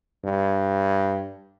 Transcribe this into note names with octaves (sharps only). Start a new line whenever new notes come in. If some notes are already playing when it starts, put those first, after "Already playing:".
G2